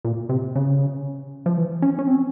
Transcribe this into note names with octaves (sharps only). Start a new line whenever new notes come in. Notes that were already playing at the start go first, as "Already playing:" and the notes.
A#2
C3
C#3
F3
E3
C#4
C#4
C4